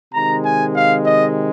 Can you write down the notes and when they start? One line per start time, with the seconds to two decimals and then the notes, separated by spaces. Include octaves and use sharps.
0.14 C3 D#3 G#3 A#5
0.45 G#5
0.76 F5
1.06 D#5